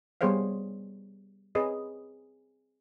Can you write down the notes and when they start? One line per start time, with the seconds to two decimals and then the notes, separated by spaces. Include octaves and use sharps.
0.21 G3 B3 G#4 C5 C#5 F5
1.55 C4 G#4 B4 C#5 D#5